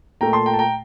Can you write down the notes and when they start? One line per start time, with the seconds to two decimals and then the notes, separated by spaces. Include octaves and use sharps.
0.21 A#2 A3 G5 A#5
0.33 A5 C6
0.46 G5 A#5
0.54 A5
0.59 G5 A#5